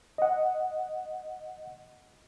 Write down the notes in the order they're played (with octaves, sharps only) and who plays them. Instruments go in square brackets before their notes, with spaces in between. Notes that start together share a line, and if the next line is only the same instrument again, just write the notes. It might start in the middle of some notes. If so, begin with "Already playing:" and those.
[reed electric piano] D#5 F#5